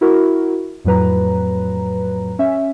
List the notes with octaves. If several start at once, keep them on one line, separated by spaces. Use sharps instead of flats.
E4 F#4 A#4
F2 A2 F#3 B4 A#5
C#4 E5